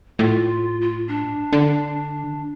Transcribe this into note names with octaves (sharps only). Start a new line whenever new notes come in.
A2 F4
F4
D4
D3